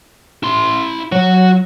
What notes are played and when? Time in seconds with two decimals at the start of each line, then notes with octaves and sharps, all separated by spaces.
0.43 E4 C6
1.12 F#3 F#4